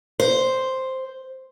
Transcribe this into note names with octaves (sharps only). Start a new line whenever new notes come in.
C5